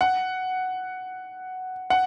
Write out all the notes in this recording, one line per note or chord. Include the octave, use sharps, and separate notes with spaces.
F#5
F#5